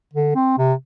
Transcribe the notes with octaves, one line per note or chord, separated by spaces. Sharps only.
D3
C4
C3